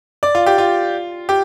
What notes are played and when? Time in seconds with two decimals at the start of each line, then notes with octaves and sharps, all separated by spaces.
0.23 D5
0.35 F4
0.46 G4
0.58 F4
1.29 G4